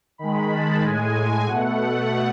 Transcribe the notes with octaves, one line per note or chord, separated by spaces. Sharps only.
D#3 G#3 B5
A5
A2 G#3 G#5
B2 A3 F#5